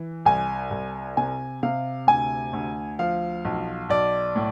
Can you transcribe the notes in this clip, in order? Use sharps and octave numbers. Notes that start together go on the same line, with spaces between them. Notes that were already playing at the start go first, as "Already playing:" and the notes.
Already playing: E3
C2 G#5
C2
C3 G#5
C3 F5
D2 G#5
D2
F3 F5
B1
B1 D5
A2